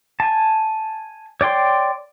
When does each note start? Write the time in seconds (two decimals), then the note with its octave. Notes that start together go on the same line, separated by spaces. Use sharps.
0.20 G#5 A5
1.41 C#5 D5 G5 C6